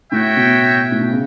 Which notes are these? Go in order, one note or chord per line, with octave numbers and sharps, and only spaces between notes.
A2 F#4 C#5 E5 G5
B2
A2
B2
C#3